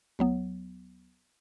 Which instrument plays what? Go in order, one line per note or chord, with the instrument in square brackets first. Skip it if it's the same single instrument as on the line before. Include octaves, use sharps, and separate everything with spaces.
[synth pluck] D2 F#3 B3